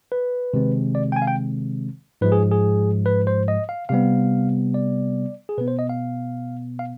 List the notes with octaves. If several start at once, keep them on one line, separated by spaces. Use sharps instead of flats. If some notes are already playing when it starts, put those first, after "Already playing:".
B4
C3 D#3 G#3 C4
D5
G5
G#5
F5
G5
G#2 F3 G#3 B4
G#4
G#4
B4
C5
D#5
F5
C3 G3 B3 F5
D5
G#4
B2 B3 B4
C5
D#5
F5
F5